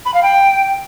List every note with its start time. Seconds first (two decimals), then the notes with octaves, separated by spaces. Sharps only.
0.05 B5
0.14 F5
0.23 G5